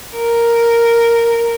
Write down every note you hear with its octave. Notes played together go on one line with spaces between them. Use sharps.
A#4